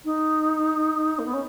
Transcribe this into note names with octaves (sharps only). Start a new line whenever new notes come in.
D#4
A#3
B3
C#4